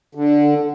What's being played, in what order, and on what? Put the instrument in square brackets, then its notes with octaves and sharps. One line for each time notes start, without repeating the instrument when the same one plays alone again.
[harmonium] D3